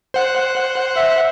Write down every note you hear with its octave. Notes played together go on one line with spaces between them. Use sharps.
C5 F#5 F#6
E5